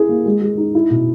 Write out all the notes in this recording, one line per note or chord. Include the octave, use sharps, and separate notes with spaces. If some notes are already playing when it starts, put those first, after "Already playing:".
Already playing: E4 G#4
A#3
G#3
G#3
D#4
E4
B2